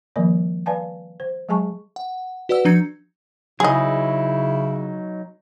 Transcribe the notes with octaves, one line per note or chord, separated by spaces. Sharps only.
D#3 F3 G3 A#3 A#4 D5
B4 D5 F5 G#5 A5
C5
F#3 G#3 G#4 G#5 A5 C#6
F#5
F#4 B4 D5 F#5 E6
F3 D4 A#5 G#6 C#7
C#3 F#3 D#4 E4 G#4 D#5